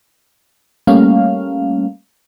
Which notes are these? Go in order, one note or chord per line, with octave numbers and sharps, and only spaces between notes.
G3 A3 A#3 C#4 F5